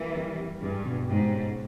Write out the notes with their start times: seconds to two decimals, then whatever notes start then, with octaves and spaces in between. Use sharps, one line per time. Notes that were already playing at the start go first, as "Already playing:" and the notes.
Already playing: E3 G3 A#3
0.16 G3
0.39 G3
0.62 G2 G#3
0.85 B2
1.08 G#2 G4
1.32 C#4